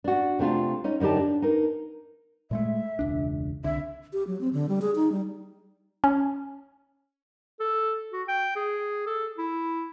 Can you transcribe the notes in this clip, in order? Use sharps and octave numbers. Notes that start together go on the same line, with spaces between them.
D4 F#4
C3 A3 D4 F4
C#4 D#4
F#2 D3 D#4 G4 A5
D4
D#4 A#4
A#2 G#3 A3 E5
E1 C#2 D4
C2 D3 E5
G4
F#3
C4
D3
G3
G#4
D#4
G3
C#4
A4
F#4
G5
G#4
A4
E4